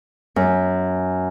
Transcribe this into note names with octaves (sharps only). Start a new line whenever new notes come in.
F#2